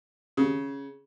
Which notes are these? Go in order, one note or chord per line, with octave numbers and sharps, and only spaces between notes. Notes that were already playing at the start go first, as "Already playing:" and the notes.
C#3